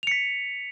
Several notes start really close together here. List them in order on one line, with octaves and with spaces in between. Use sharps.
F7 C#7 B6